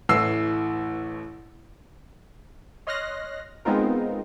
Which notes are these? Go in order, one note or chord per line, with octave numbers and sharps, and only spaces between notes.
A1 E3 A3 E6 C7
C#5 D#5 C6 F6 F#6 A#6
G#3 B3 C4 D#4 F4 A#4